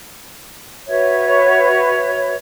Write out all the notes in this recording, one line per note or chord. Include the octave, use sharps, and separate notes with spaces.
F#4 B4 C#5 E5